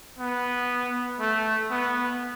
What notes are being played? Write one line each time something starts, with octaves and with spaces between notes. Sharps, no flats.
B3
A3
B3